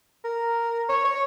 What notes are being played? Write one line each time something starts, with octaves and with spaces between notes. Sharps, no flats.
A#4
C#5
C#5